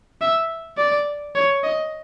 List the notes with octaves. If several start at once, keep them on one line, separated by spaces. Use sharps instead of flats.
E5
D5
C#5
D#5